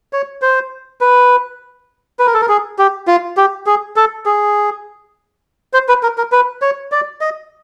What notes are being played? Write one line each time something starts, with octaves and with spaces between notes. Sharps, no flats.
C#5
C5
B4
B4
A#4
A4
A#4
G#4
G4
F4
G4
G#4
A4
G#4
C5
B4
A#4
A#4
B4
C#5
D5
D#5